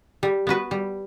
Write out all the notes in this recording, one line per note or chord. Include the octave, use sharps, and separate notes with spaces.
G3
B3 F#4 B4
G3